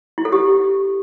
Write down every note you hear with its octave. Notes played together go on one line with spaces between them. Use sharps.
E4
A4
G4